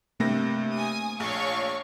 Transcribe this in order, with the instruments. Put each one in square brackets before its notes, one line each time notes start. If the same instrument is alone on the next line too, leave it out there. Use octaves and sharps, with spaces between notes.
[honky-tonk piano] G2 C3 A#6 [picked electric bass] A3 A#3
[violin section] G#5 D#6
[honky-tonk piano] A#1 [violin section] C#5 F5 C#6